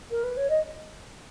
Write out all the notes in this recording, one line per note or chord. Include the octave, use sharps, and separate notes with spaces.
A#4
B4
C#5
D#5